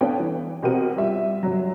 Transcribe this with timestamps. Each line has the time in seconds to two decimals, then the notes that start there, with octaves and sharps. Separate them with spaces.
0.01 B3 D4 A4 C#5 F5 G5
0.20 E3
0.63 B2 C4 G4 A#4 F#5 D#7
0.97 G3 F4 E5
1.43 G1 F#3